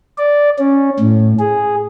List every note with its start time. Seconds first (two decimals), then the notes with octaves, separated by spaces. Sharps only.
0.18 D5
0.59 C#4
1.00 A2
1.39 G#4